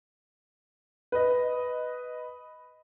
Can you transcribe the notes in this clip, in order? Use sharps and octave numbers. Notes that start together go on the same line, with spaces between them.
B4 D#5